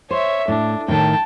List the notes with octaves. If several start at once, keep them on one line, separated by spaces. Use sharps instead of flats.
C5 C#5 E5
A2 D4
A2 D#3 G5 A5